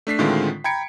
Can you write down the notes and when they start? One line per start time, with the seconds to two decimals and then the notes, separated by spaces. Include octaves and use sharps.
0.07 A3 D4 B6 C7
0.19 A2 D3 D#3 G#3 C4 F4
0.64 G5 A#5 B5 G#6 C#7 D7